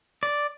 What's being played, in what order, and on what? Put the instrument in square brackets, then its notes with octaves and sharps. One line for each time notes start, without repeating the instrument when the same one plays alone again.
[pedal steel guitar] D5